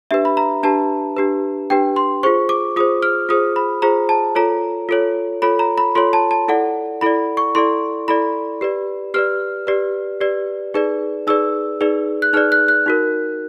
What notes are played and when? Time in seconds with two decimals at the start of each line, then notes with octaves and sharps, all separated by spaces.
0.11 D4 G4 B4 E5
0.25 B5
0.37 A#5
0.63 D4 G4 B4 A5
1.17 D4 G4 B4
1.70 D4 G4 B4 G5
1.96 C6
2.23 F4 G#4 C5 C#6
2.49 D6
2.76 F4 G#4 C5 D#6
3.03 F6
3.29 F4 G#4 C5 D#6
3.56 B5
3.82 F4 G#4 C5 A#5
4.09 A5
4.35 F4 A4 C#5 A#5
4.89 F4 A4 C#5
5.42 F4 A4 C#5 B5
5.59 A#5
5.78 B5
5.95 F4 A4 C#5 C6
6.13 A5
6.31 A5
6.48 E4 A4 D5 F#5
7.01 E4 A4 D5 B5
7.37 C#6
7.55 E4 A4 D5 C6
8.08 E4 A4 D5 B5
8.61 G4 B4 D5
9.14 G4 B4 D5 F6
9.67 G4 B4 D5
10.21 G4 B4 D5
10.74 D#4 G#4 B4 D5
11.27 D#4 G#4 B4 D5 E6
11.81 D#4 G#4 B4 D5
12.22 F#6
12.33 D#4 G#4 B4 D5 F6
12.52 F#6
12.68 F#6
12.86 D#4 F#4 A#4